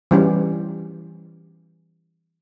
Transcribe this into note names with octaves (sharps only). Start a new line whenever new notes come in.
E3 G3 C#4